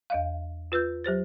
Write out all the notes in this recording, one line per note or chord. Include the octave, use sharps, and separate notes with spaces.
E2 D#5 F5
F4 B4 E6 G6
F#3 G4 C5 A6